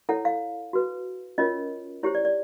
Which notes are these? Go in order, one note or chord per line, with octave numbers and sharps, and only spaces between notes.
E4 A4 C#5 F#5
F5
F#4 B4
C#4 F4 A#4 C#5 D#5
E4 G4 C5 C#5
D5
D5